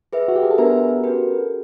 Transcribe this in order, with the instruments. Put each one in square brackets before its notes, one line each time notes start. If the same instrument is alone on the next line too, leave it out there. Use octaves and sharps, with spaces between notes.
[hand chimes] G#4 B4 E5
[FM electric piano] F#4
G4
G#4
A4
[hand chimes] B3 D4 F#4 B4 E5 [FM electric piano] A#4
[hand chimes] C#4 F#4 B4